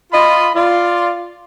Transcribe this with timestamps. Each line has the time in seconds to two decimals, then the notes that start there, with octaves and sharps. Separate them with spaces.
0.12 F4 D#5 B5
0.55 F4 D5